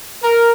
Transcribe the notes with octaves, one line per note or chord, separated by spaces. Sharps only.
A#4